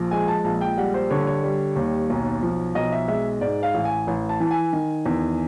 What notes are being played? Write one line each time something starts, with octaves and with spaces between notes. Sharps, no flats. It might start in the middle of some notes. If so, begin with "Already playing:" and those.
Already playing: A#1 F3
G#3 G#5
A5
A#1 A5
G5
G3 F#5
C5
D3 C#5
C#5
G3
D#2
B1
F3
B1 D#5
E5
G#3 E5
G#2 D5
F5
A1
G#5
A1
A5
E3
A5
G#5
D#3
E2